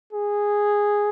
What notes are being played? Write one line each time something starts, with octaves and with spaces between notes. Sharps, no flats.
G#4